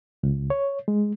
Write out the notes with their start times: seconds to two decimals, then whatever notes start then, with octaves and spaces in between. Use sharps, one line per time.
0.23 C#2
0.50 C#5
0.88 G#3